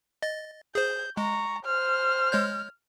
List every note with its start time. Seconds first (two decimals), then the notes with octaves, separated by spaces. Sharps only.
0.22 D#5 A6
0.75 G#4 C5 G6
1.17 G#3 A#5 C#6
1.65 C5 F6
2.32 G#3 C#5 G6